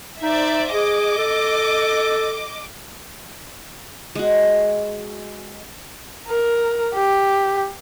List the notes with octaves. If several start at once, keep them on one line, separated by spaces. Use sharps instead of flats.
D#4 C5 D5 E5
G#4 D#5 D6
A4
G#3 F#4
A#4
G4